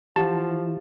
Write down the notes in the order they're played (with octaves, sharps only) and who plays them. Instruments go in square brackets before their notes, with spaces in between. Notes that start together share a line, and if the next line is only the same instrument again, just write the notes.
[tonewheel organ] E3 [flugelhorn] F3 [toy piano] G4 F#5 [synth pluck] A5